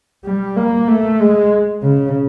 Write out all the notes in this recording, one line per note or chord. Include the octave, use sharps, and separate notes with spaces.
G3
A#3
A3
G#3
C#3